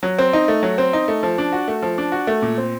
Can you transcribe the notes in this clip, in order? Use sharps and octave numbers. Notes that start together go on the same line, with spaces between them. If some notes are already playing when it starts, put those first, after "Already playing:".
F#3
C4
D#4
A3
F#3
C4
D#4
A3
F3
D4
F#4
A3
F3
D4
F#4
A3
A#2
C4